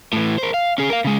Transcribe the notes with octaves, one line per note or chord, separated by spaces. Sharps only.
A2 E3
A#4 C5
F5
C#4 G#4
A#4 F5
C#3 G#3